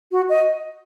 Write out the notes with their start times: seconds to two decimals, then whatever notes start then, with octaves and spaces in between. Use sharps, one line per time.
0.12 F#4
0.29 D#5